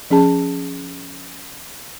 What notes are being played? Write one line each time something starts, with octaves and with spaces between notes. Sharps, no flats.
F3 C#4 G#4 A5